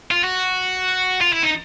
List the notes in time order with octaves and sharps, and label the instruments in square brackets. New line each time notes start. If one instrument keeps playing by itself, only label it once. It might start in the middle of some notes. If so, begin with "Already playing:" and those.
[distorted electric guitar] F4
F#4
F4
E4
D#4